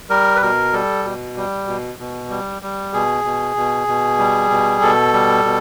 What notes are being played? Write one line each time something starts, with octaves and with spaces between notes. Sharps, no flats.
G3 A#4
B4
B2 A#4
G3 A4
B2
G3
B2
B2
G3
G3
B2 G#4
B2
B2
B2
G3
B2
B2 A4
G3
B2